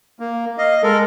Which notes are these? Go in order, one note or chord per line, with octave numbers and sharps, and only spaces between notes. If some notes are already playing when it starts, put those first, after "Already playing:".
A#3
D#5 F5
G#3 A4 A#4